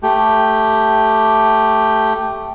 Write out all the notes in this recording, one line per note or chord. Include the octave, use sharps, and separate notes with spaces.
A3 G4